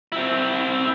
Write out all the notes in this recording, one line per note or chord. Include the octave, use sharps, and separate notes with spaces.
C4 E4